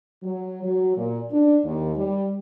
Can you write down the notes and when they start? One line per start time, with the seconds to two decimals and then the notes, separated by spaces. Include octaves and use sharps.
0.23 F#3
0.64 F#3
0.96 A#2
1.32 D4
1.65 D#2
1.96 G3